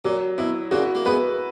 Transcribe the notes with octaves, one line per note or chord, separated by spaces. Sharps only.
A#2 F#3
B2 E4
A#2 C#3 F#4
A#3
G#3 B3 B4